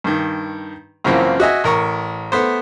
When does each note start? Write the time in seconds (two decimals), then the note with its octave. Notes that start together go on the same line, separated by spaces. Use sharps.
0.04 G2 D#3
1.04 F#2 C#3 E3 F3 A#3 C4
1.40 F#4 D#5 E5 G#5
1.64 A1 A#4 C#6
2.32 A3 B3 C5